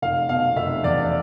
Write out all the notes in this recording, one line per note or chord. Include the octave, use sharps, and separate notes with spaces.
F1 F5
B2 F5
F1 E5
E2 D5